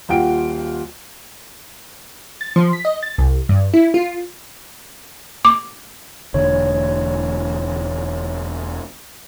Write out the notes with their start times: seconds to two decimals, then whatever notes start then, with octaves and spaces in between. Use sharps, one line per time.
0.09 D#1 F4 F#4 G5 D7
2.41 A6
2.56 F3
2.73 B6
2.85 D#5
3.03 A6
3.18 C2
3.49 G2
3.74 E4
3.94 F4
5.45 D6
6.34 E1 D3 C#5